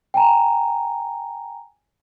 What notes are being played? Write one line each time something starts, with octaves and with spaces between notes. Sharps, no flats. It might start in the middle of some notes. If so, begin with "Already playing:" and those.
G5 G#5 A#5